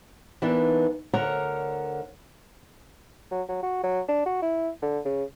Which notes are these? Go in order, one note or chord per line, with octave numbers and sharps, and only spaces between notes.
E3 A#3 B3 D4 D#4
D2 D3 A#4 C#5 F#5 A#5
F#3
F#3
F#4
F#3
D4
F#4
E4
D3
C#3